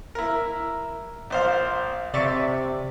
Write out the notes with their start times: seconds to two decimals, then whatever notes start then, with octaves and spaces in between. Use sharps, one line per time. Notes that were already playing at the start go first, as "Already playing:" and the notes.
0.15 E4 A#4
1.30 A#1 C5 F5
2.14 C3 D5 E5 C#6